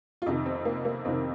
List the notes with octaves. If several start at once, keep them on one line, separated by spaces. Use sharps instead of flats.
F4
F2 C3 D#3 D#4
C4
A#3
A#3
F2 C3 D#3 C4